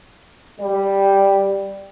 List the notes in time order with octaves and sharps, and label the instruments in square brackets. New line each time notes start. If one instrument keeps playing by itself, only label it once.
[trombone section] G3